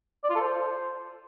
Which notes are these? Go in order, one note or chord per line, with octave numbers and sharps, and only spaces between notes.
D5
F4
A4
C5